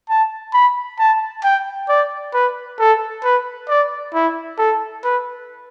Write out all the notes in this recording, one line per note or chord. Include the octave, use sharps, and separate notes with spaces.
A5
B5
A5
G5
D5
B4
A4
B4
D5
E4
A4
B4